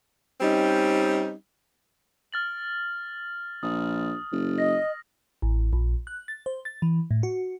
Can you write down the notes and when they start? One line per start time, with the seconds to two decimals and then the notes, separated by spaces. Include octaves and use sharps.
0.41 G3 C4 C#4 D#4
2.33 F6 A6 F#7
3.63 A#1 D#6
4.32 F#1
4.58 D#5 A#6
5.42 A1
5.73 A#1
6.07 F#6
6.28 A6
6.46 C5
6.65 A6
6.82 E3
7.11 A2
7.23 F#4